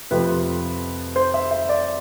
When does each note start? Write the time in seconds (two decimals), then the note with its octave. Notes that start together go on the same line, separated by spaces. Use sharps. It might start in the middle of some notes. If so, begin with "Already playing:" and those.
0.11 F2 C3 F3 A3 C4 B4
1.16 C5
1.34 E5
1.51 E5
1.69 D5